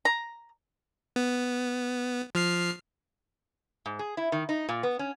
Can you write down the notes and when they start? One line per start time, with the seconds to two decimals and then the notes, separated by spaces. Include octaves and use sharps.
0.05 A#5
1.16 B3
2.35 F3 F6 C7
3.86 G#2
3.99 G#4
4.17 E4
4.32 D#3
4.49 D#4
4.69 A#2
4.83 B3
4.99 C#4